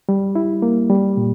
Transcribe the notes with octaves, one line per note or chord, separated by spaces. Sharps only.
G3
E4
A#3
G3
A#2